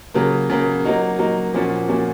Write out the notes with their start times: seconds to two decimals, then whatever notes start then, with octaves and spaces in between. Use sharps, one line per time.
0.14 C#3 F#3 A#3
0.50 C#3 F#3 A#3
0.84 F#3 A#3 D#4 F#4
1.19 F#3 A#3 D#4 F#4
1.54 A#2 F3 A#3 C#4 F#4
1.88 A#2 F3 A#3 C#4 F#4